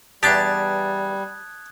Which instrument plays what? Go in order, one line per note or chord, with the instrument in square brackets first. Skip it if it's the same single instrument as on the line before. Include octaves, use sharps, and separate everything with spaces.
[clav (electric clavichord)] E2 D4 G4 [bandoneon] G3 [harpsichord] A5 [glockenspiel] D#6 F#6 G#6